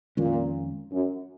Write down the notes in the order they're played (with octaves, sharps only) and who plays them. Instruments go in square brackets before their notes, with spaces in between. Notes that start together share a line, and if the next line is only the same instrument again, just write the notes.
[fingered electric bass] F2 D#3 G#3 C#4 [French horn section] A#2
[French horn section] F#2